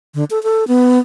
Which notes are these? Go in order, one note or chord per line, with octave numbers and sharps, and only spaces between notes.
D3
A4
A4
B3